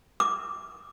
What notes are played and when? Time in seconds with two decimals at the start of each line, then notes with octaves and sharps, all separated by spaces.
0.20 D6